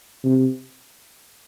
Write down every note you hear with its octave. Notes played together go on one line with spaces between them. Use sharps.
C3